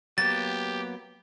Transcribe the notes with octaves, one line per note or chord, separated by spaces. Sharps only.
F#3 A#3 B3 G4 A6